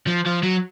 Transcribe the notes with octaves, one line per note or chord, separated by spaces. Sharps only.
F3
F3
F#3